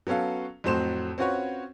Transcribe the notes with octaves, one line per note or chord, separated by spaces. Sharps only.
F#3 B3 C#4 A4 F5
F2 A2 F#3 C5 C6 E7
C4 C#4 F4 F#4 B4 C#5